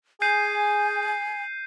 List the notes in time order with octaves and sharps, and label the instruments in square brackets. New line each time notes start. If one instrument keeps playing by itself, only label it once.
[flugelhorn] G#4 [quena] G#5 [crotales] G6 C7 D#7